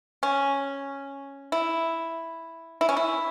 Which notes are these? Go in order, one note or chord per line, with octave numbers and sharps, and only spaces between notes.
C#4
E4
E4
C#4
E4